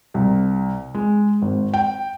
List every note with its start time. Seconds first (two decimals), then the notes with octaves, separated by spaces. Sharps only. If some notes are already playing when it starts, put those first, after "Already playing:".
0.14 C2
0.95 G#3
1.42 G#1
1.74 G5